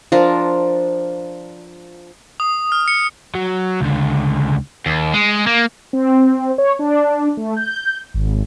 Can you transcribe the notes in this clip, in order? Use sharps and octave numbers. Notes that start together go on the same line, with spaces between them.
F3 D4 A#4
D#6
F6
C#7
F#3
C#2 D3
D#2
G#3
A#3
C4
C#5
D4
A3
G6
G#1